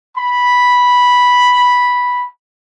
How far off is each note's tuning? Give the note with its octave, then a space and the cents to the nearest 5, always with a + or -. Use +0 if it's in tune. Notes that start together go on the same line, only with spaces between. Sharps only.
B5 -5